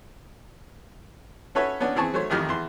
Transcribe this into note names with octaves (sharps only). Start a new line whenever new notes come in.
C#4 F#4 A4 B4 C#5 E5
B3 C#4 D4
E3 C4 G#4 A5 C#6
F#3 A3 C5 C#5
A1 F2 D#3 G4 F6
E2 C6